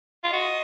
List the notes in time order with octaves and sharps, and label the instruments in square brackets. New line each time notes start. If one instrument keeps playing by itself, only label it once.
[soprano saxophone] F4
[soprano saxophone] F#4 [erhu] D#5